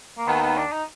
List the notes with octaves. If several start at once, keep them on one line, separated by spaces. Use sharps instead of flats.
A#3
D#2 D#3 B3
B3
D4
D#4